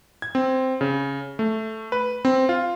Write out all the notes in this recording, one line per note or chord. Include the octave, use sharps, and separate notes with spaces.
G#6
C4
C#3
A3
B4
C4
F4